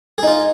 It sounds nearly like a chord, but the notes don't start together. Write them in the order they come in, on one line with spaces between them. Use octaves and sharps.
G#4 D#4 F4